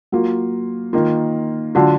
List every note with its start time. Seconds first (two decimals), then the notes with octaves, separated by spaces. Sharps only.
0.12 F#3 A#3 F4
0.93 D#3 A#3 F4
1.75 D3 F#3 D4 F4